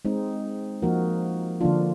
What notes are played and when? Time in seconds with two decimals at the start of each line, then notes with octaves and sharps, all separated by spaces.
0.05 G#3 C4 D#4
0.82 F3 A#3 D#4 F#4 A#4
1.61 D3 F3 A#3 D4 F4